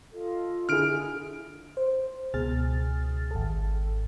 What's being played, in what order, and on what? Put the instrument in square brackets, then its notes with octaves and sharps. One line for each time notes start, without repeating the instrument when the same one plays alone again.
[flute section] F4 A4 D#5
[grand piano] D3 E4 G#4 [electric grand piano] F6 D7
[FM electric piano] C5
C#2 B2 G#4 F6 A6
G#1 A4